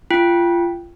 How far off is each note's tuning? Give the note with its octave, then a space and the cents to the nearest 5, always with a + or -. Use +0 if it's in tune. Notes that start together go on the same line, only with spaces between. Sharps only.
F4 -25 G5 +0